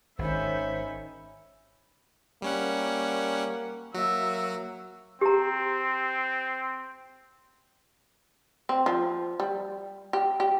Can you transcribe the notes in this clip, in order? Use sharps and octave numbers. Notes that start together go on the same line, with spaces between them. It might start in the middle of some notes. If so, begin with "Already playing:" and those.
G#1 D#3 C#4 C5 E5 B5
G3 A#3 C#4 F#5
F#3 A#3 F#4 E5
C4 G4 A#5
C4
F3
G3
G4
G4